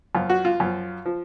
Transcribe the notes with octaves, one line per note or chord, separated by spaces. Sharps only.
F#2 F3 F4
F#4
F4
F#2 F3
F3